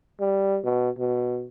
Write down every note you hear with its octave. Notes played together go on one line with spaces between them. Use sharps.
G3
B2
B2